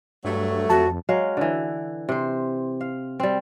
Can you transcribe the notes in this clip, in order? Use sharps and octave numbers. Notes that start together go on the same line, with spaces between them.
G2 F#3 A3
F2 F#4 A5
F#3 G#3 F5
D3 E3
C3 C5
F5
G3 C4